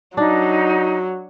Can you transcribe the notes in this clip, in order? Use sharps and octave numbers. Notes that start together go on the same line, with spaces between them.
F#3 D4 D#4